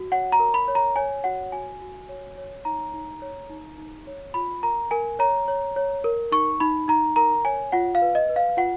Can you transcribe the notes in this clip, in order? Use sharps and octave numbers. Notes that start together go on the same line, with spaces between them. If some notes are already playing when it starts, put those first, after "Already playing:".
Already playing: F#4
C#5 F#5
A#5
A#4
B5
C#5
A#5
C#5 G#5
F#4 F#5
F#4 G#5
F#4
C#5
C#5
D#4 A#5
D#4
C#5
D#4
D#4
C#5
F4 B5
A#4 A#5
A#4 G#5
C#5 A#5
C#5
C#5
A#4
D#4 C#6
D#4 B5
D#4 A#5
A#4 A#5
C#5 G#5
F4 F#5
F5
B4
D#5
B4
F5
F4 F#5